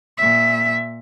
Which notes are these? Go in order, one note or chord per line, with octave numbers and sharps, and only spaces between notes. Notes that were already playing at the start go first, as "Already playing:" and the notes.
A#2 E5